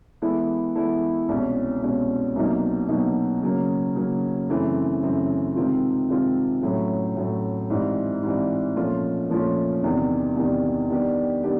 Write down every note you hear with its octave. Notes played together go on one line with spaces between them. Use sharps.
E3 G#3 B3 E4 A4
E3 G#3 B3 E4 A4
C2 B2 G#3 C#4
C2 B2 G#3 C#4
C2 B2 F#3 A#3 D#4
C2 B2 F#3 A#3 D#4
C#3 F#3 A#3
C#3 F#3 A#3
F#2 C#3 E3 A3 C4
F#2 C#3 E3 A3 C4
C3 D#3 G#3 C4 F4
C3 D#3 G#3 C4 F4
A2 F#3 A3 C#4
A2 F#3 A3 C#4
G#2 E3 G3 C4
G#2 E3 G3 C4
A#2 F3 A3 C#4 F4
A#2 F3 A3 C#4 F4
E2 C3 D#3 G3
E2 C3 D#3 G3
D#3 G3 B3 D4 G4
D#3 G3 B3 D4 G4